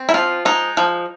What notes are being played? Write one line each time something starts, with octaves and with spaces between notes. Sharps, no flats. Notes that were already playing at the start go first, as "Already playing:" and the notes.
Already playing: C4
E4
F3 F4
G#3 D#4
F3